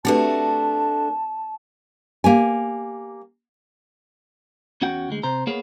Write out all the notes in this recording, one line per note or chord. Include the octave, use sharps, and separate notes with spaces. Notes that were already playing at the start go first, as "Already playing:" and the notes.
A3 C4 D4 F#4 G4 B4 A5
A#3 G4 G#5
E2 C#4 F#4 F#5 G5
D2 G#3
C3 C5 A#5
A#3 B3 G#4 C#5